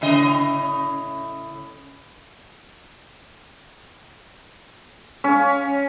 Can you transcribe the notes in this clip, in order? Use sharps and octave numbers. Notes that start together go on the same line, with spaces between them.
A2 C#3 D#5
C#4